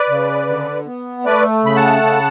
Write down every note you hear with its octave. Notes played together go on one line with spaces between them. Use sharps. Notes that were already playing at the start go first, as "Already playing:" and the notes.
Already playing: B4 D5
C#3
D3
B3
A3 B4 D5
C#3 B5
F#5 A5
C#3